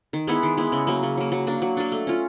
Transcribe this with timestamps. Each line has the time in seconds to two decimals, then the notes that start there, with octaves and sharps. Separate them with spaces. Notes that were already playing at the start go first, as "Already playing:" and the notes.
0.13 D#3
0.27 G#3 B3 E4
0.43 D#3
0.57 G#3 B3 E4
0.72 C#3
0.87 F#3 A#3
1.03 C#3
1.17 F#3 A#3
1.32 F#3
1.47 A#3 D4
1.62 F#3
1.77 A#3 D4
1.92 A3
2.07 C#4 F4